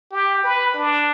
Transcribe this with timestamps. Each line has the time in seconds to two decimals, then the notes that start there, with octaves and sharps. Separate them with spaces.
0.12 G4
0.44 B4
0.74 D4